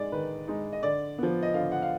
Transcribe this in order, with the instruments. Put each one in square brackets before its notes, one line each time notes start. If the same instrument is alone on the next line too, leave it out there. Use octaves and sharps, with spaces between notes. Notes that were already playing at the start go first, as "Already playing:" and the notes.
Already playing: [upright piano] G#3 D#4 D5
D#3 B4
G#3 D#4
D#5
D3 D5
F3 B3
D#5
D3 F5
F#5
F5